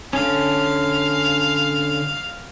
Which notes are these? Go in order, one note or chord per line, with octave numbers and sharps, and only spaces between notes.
D3 C#4 F5